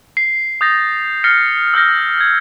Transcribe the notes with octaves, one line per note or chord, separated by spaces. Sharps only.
C7
D#6 G6 A6 A#6
F6 A6 A#6 C7 C#7
E6 F6 G6 A#6
G#6